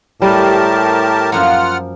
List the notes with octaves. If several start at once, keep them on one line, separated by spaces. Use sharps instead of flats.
A2 G3 G4 A#4 A5
F#2 F3 A#3 F4 F#5 F6